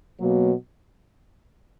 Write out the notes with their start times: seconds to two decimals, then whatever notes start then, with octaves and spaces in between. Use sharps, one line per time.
0.20 B2 F#3 A#3